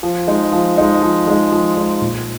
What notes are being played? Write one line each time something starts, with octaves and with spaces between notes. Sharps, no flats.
F3
G#3 D#4
F3
G#3 D#4
F3
G#3 D#4
F3
G#3 D#4
A#2